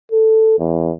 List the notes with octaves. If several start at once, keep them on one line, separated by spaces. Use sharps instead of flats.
A4
E2